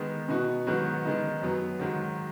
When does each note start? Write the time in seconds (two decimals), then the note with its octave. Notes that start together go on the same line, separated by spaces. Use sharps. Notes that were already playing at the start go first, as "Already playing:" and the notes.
Already playing: D#3 G#3 B3
0.29 B2 B3 D#4 F#4
0.67 G#2 D#3 F#3 B3 F#4
1.05 D#3 G#3 B3 D#4
1.42 F#2 F#3 B3
1.79 G#2 D#3 F#3